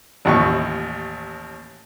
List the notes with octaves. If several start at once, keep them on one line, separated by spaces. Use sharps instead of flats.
A1 D#2 C#6